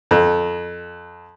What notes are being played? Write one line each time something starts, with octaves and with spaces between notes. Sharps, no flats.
F2